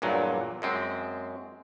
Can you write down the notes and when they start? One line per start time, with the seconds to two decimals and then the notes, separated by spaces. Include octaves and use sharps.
0.02 E2 G2 A#2 F#3
0.62 F#2 G#3 C4